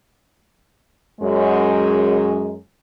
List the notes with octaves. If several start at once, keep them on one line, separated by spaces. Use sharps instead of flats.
F#2 G#3